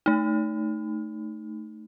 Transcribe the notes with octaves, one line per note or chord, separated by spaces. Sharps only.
A3 D#4